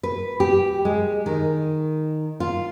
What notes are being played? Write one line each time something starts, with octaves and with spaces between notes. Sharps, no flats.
B4
G4
G#3
D#3
F4